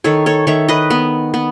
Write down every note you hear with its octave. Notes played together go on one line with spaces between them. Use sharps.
D#3 A4 C#5
A4 C#5
D#3 C#5 E5
B4 D#5
B3
B3